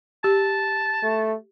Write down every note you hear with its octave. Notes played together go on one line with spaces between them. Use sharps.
G4 A5
A3